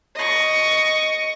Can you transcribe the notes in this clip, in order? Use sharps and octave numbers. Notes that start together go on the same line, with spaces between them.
D#5 C#6